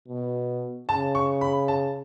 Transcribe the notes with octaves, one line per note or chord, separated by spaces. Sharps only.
B2
C#3 A5
C#6
B5
A5